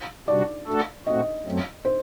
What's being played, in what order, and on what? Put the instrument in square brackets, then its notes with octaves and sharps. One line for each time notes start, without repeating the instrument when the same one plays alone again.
[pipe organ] C3 G3 D4 F#4 [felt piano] D5
[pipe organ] A3 D4 F#4 A4
[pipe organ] A#2 A3 C4 F#4 [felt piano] D#5
[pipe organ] F#2 F#3 A3 C4
[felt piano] C5